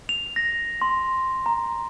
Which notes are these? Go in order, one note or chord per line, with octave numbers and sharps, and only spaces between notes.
F7
A#6
C6
A#5